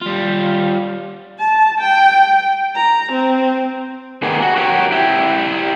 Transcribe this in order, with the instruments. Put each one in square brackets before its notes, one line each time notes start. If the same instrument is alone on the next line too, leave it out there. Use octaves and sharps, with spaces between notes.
[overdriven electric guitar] G3 F4
[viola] A5
G5
A#5
C4
[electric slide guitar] D#3 A#3 B3 G#4
F#4
F#4 G4 A#4 C#5
E4 G4